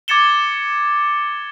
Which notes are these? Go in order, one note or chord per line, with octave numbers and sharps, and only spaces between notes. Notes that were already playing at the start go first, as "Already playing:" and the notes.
D6 G#6 A6 C#7 E7 G7